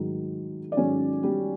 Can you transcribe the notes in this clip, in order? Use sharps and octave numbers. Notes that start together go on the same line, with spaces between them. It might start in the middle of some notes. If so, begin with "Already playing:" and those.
Already playing: G#2 D#3 F#3
D5
G#2 D#3 F#3 C#4 C#5
G3 G4